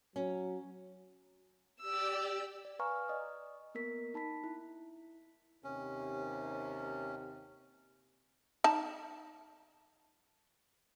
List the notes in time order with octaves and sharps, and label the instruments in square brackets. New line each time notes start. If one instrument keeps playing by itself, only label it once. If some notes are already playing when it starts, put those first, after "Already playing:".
[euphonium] F#3 [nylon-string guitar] C#4
[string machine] G4 D5 [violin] E6
[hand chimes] D5
B4 F5 G#5 A#5 C#6 F6
D5 D#5 D#6
A#3 B3 A#4 B6
D#4 A5 B5 B6
E4
[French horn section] D#2 C3 [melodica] C#4
[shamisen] D#4 A5